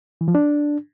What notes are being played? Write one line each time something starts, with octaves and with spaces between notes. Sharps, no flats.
E3
F3
D4